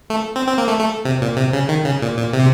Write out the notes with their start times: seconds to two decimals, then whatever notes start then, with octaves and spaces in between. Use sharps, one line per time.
0.10 A3
0.36 C4
0.47 C4
0.58 A#3
0.68 A3
0.79 A3
1.05 C3
1.22 A#2
1.37 C3
1.53 C#3
1.69 D#3
1.85 C#3
2.02 A#2
2.17 A#2
2.33 C3